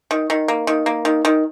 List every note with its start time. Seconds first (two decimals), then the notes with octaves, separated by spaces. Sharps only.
0.11 D#3
0.30 D#3
0.48 A#3
0.67 D#3
0.86 A#3
1.05 D#3
1.25 D#3